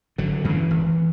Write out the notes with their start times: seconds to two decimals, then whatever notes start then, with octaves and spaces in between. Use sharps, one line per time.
0.18 G#1 D3 F#3
0.44 F#2 C#3 E3 G#3
0.71 G#1